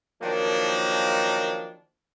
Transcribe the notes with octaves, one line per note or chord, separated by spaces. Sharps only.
D#3 F3 F#3 A#3 D4